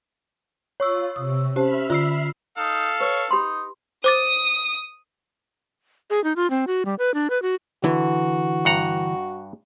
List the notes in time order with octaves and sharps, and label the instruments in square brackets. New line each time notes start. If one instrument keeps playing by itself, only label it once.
[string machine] F4 [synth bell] C#5 C#6 E6
[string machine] C3 [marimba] D#6
[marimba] C#4 C5 A5 [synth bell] G4 [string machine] E5 B5 F6
[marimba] D3 [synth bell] F4 E6 C7
[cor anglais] D#4 [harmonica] A4 F5
[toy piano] B4 [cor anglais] C#5
[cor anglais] D#4 [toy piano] G4 B5 C6
[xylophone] C5 D6 A6 [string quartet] D#6
[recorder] G#4
D#4
F4
C4
F#4
G3
B4
D4
B4
F#4
[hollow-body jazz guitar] D3 E3 [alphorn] F#4
[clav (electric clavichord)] G2 F#5 A#5